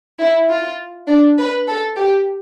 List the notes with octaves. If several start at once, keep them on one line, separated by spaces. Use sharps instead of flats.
E4
F4
D4
B4
A4
G4